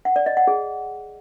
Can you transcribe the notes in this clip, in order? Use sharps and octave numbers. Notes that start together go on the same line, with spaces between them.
F#5
D5
D#5
F#5
G#4